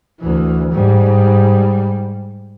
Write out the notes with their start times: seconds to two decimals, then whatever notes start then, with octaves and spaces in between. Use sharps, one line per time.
0.20 D2 E3
0.72 G#2 G3